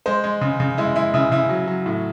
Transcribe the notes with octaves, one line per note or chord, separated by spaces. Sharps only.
G#3 C5
G#3
C#3
C#3
G#3 E4
G#3 E4
C#3 E4
C#3 E4
F#3
F#3
A2